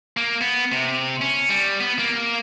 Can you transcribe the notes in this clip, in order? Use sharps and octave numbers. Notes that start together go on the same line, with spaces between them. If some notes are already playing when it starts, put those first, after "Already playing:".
A#3
B3
C3
C#4
G3
B3
A#3